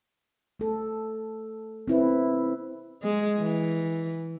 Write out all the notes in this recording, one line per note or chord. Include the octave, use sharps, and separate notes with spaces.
A3 A4
C4 E4 B4
G#3
E3